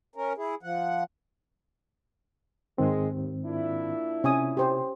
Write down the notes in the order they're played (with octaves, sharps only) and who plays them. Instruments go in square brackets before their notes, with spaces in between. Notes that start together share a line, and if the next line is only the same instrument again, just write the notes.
[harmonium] C#4 A#4
E4 G#4
F3 F#5
[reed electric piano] G#2 D#3 C4 [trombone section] G#3
[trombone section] D#2
A#2 D4 E4
[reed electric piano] C3 [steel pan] C#4 G#5 D#6
[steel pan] G4 C5 C#5